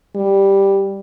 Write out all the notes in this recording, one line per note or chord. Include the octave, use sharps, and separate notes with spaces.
G3